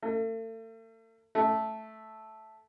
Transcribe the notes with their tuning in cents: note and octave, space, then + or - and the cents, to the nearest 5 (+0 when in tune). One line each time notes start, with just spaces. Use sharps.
A3 +40
A3 -5